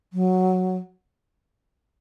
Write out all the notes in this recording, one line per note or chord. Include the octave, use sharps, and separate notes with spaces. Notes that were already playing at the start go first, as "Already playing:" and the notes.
F#3